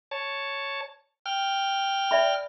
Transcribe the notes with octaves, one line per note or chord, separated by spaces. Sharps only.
C#5 A5
G5 F6
D5 E5 B5